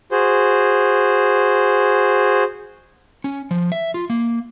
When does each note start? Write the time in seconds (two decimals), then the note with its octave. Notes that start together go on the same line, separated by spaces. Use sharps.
0.12 F#4 G#4 C5
3.24 C#4
3.51 F3
3.72 E5
3.94 F4
4.10 A#3